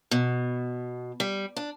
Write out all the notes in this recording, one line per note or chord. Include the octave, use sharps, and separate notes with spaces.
B2
G3
D4